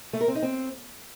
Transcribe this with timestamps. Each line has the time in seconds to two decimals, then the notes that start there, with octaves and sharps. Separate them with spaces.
0.13 A3
0.21 A#4
0.28 C4
0.35 D#4
0.42 C4